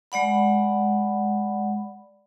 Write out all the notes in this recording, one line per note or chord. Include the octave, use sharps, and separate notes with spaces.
G#3 D5 F#5 B5